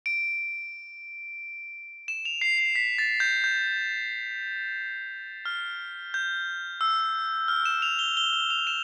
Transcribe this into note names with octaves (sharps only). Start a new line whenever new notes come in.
D7
E7
F7
C7
C7
B6
A6
G6
G6
F6
G6
E6
F6
E7
F7
G7
G7
G7
F7
E7